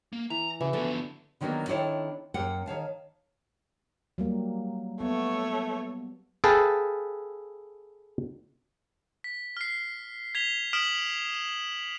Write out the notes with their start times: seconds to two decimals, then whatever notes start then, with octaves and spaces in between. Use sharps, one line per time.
0.13 A#3
0.30 E3 A#5
0.61 C#3 E3 F#4
0.73 D3 F3 A3 B3
1.41 D3 D#3 F#3 A#3 B3 D4
1.67 D#3 C4 D4 E4 A4 C#5
2.34 F#2 A#3 F#5 G5
2.66 D#3 C#5 F5 A5
4.18 F#3 G3 A#3
5.00 A3 B3 C#5
6.44 G#4 A4 B4 F5 G5 A5
9.24 B6
9.57 F6 C7
10.35 G#6 B6 F7 G7
10.73 D#6 F6 B6 D7 E7 F#7
11.34 E7